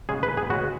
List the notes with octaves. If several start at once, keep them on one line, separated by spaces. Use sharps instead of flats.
C#3 G#3 C#4 G#4
B4
G#4
C#3 G#3 C#4 F#4